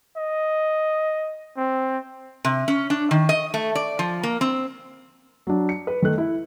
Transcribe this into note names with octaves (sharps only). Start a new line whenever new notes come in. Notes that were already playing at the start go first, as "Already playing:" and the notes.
D#5
C4
C3
C#4
D4
D#3
D#5
A3
D5
F3
A#3
C4
F#3 D4
C#7
B4
D#3 A3 F#6
E4